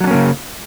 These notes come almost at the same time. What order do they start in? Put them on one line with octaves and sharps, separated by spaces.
F#3 D4 C#4 A#3 C#3